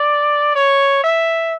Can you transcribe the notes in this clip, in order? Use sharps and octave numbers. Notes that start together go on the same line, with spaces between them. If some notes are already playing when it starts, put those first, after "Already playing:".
Already playing: D5
C#5
E5